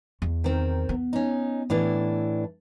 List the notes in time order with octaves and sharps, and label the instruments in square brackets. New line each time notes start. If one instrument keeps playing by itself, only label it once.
[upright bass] E2
[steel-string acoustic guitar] D#3 C4 A#4
[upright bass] B3
[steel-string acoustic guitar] C#4 D#4
A2 E3 D4